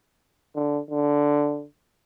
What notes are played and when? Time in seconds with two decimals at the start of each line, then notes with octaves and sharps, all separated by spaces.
0.56 D3
0.90 D3